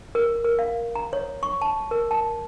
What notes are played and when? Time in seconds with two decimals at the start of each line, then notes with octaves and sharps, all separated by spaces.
0.15 A#4
0.44 A#4
0.59 F5
0.95 A#5
1.13 C#5
1.43 C#6
1.61 A5
1.91 A#4
2.11 A5